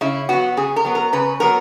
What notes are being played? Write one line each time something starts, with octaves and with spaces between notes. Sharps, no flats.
C#3 E4
F#3 B3 F#4
C#3 G#4
A#4
F#3 B3
A#4
C#3 B4
F#3 B3 A#4